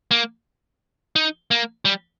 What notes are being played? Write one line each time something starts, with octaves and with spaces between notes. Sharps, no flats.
A#3
D#4
A#3
G3